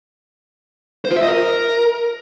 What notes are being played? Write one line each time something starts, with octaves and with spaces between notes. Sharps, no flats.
C5
F4
E5
D#5
A#4